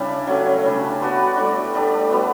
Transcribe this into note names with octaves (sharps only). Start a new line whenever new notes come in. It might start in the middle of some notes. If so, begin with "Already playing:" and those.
Already playing: C#3 G3 D4 E4
F#3 A3 C#4
C#3 G3 D4
B3 F#4 B4 D5
A2 G3 D4
A3 D4 G4
G3 B3 F#4